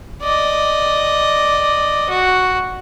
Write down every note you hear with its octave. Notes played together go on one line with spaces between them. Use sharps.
D5 D#5
F#4